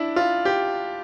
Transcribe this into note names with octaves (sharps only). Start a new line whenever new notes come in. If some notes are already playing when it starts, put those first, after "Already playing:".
Already playing: D4 E4
F4
G4